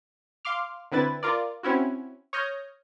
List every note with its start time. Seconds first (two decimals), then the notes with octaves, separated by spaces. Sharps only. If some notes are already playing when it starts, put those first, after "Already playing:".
0.45 F5 C6 D6 F6
0.92 D3 C4 E4 B4 A6
1.23 F4 A#4 D5
1.63 C4 C#4 E4 F#4
2.33 C#5 D#6 F6 G6 A#6